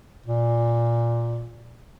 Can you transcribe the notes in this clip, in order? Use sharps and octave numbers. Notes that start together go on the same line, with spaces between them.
A#2